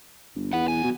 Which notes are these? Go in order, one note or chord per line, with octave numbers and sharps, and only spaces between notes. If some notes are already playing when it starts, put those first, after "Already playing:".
G1
E2 B3 F#5
B1 G#5
B2